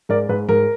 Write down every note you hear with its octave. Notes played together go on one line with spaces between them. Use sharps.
G#2 A#4 D5
G#2 B4
G#2 A#4